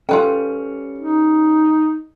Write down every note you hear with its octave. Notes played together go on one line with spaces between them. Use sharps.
G3 C#4 F4 A4 B4 G5
D#4